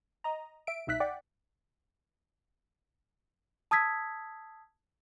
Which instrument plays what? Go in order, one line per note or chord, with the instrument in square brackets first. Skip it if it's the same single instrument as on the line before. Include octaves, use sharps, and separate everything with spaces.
[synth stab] D#5 A#5
E5 D7
C2 B2 D#4 E5 F#6 B6
D5 F#5 G5
[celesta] A5 D#6 E6 G#6 B6